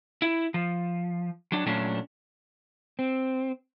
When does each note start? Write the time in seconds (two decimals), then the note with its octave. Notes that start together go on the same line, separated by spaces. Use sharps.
0.22 E4
0.54 F3
1.52 F#3 D4
1.66 A#2 F#3 A3 C#4 D4
2.99 C4